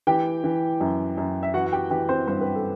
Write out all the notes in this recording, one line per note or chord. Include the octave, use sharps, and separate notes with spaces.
E3 G4 G5
E3
F#2
F#2
E5
E3 F#4 F#5
F#5
G4 G5
E3 G4 G5
C4 C5
G2 C5
B4
A4